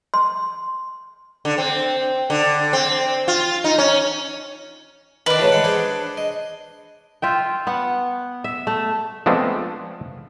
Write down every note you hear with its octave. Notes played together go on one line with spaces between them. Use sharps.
C6
D3
C4
D3
C4
F4
D#4
C#4
D#3 D4 A#4 B4
A2 C#3 E3
G#3 F#5
G#4 C5 D5
D#5
F4 E5 G5
B3 F#5
E5
A3
F3 G#3 A3 B3 C4 D4